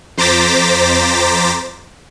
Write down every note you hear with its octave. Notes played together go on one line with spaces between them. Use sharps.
F2 C5 A#5 D6 A6 B6